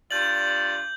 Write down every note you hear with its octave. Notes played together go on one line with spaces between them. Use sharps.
G2 F4 D5 G6 F#7